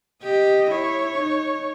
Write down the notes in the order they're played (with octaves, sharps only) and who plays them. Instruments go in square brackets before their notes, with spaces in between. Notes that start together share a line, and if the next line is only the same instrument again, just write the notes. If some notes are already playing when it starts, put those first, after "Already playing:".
[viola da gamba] G4 [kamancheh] D#5
[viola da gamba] E4 [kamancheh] C#5
[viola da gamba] D#4